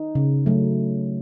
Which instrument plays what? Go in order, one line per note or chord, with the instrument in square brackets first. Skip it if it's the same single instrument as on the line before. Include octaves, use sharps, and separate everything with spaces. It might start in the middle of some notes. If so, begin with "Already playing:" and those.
Already playing: [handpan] D#4
C#3
F#3 A3